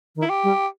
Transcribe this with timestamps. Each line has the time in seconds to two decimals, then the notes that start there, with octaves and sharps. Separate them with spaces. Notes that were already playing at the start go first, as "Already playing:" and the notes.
0.16 D#3
0.22 E4
0.29 G4
0.43 G3